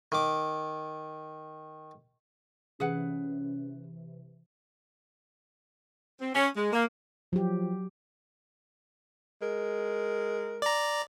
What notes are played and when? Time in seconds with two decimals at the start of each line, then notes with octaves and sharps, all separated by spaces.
0.12 D#3 D6
2.80 C3 E3 C#4 G#4 B4 F#5
6.20 C4
6.35 C#4
6.56 G#3
6.72 A#3
7.33 F3 F#3 G4
9.42 G#3 A#4
10.62 D5 A#5